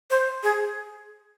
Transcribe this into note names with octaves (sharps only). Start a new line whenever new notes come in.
C5
G#4